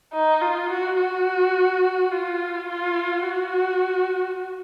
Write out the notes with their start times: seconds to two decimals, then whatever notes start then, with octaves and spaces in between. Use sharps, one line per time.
0.13 D#4
0.42 F4
0.70 F#4
0.98 F#4
2.11 F4
2.69 F4
3.25 F#4